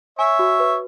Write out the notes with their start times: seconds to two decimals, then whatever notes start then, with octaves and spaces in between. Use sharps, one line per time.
0.19 C#5 E5 G#5
0.39 F#4
0.60 B4